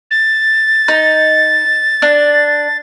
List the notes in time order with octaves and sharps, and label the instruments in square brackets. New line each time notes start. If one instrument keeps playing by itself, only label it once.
[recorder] A6
[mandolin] D#4
D4